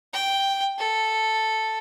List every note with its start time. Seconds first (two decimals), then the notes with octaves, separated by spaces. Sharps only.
0.13 G5
0.78 A4